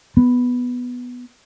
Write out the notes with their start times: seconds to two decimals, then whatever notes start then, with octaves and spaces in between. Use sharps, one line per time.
0.17 B3